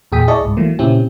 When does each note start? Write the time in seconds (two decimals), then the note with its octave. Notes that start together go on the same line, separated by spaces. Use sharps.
0.12 E2 A#2 G#4 G5 D#6 B6
0.28 E4 G#4 D5 D#5 A5 C#6
0.41 C2 G#2
0.57 E3 F#3 A3 A#3
0.79 A#2 C#3 C4 C#4 E4 G4